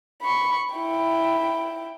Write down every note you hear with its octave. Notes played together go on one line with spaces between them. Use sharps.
B5 C#6
E4 G5